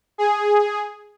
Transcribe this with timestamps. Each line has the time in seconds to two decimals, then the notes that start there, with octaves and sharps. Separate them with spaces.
0.18 G#4